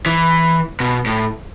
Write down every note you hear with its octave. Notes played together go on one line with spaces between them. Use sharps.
E3
B2
A2